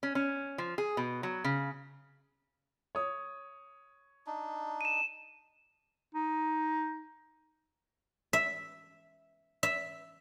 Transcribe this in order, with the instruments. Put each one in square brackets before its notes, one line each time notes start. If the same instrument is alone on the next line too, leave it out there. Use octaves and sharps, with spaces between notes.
[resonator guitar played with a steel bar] C#4
C#4
F3
G#4
B2
F#3
C#3
[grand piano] C#5 D#6
[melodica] D4 D#4
[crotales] D#7 E7
[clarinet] D#4
[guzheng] E5
E5